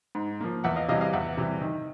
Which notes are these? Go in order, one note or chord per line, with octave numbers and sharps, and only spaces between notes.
G#2
F3 A#3
E2 E5 F#5
D#5 F5
C3 E3 G3 D#5 F5
D#5 F5
E2 E5 F#5
C3 E3 G3
D#3